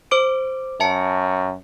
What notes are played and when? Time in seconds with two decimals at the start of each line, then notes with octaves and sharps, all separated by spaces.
0.11 C5 D6 D7
0.80 F#2 E5 A5 C#7